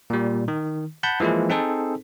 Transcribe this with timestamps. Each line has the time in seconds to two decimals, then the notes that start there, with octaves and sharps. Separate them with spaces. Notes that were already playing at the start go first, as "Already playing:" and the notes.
0.10 A#2 G3
0.48 D#3
1.03 F#5 A5 B5 G6
1.20 E3 F3 G#3 A#3 E4
1.50 C4 D#4 G#4 A4 C5